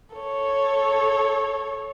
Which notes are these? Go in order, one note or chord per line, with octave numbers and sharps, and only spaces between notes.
A4 C#5